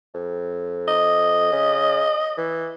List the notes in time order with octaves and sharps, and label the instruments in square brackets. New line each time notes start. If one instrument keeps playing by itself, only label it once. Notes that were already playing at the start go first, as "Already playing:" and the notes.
[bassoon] F2
[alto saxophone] D#5
[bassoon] C#3
E3